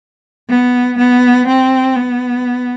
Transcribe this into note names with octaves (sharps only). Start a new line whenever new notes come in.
B3
B3
C4
B3